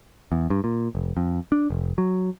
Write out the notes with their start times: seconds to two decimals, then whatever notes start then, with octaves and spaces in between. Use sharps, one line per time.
0.32 E2
0.50 G2
0.64 A#2
0.95 F1
1.17 F2
1.52 D4
1.70 F1
1.98 F#3